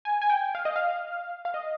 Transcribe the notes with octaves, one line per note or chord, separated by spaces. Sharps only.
G#5
G#5
G5
F5
D#5
F5
F5
D#5